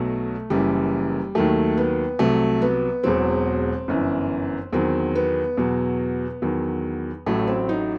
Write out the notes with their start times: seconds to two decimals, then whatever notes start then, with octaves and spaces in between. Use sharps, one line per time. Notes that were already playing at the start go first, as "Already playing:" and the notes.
Already playing: B1 B2 F#3 A3
0.50 F#1 F#2 E3 G3
1.35 D#2 D#3 F#3 A3
1.77 B3
2.19 C2 C3 F#3 A3
2.62 B3
3.03 E1 E2 B2 F#3 C4
3.88 G1 F#2 E3
4.73 E2 D#3 F#3 C4
5.15 B3
5.57 E2 B2 F#3
6.42 E2 D#3 F#3
7.26 A1 A2 F#3 A3
7.47 C4
7.69 D#4